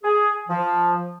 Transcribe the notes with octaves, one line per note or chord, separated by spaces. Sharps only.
G#4
F3